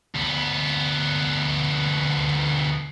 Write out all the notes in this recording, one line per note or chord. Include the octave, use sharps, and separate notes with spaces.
D2 B3